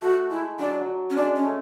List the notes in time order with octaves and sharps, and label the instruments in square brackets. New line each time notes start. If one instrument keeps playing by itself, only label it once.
[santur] A3 [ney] F#4
[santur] G#3 [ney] E4
[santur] F#3 [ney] D4
[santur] F#3
[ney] C#4
[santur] G#3 [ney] D4
[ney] C#4
[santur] A3